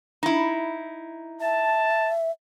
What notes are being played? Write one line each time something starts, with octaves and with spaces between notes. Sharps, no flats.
D#4 E4
E5 A5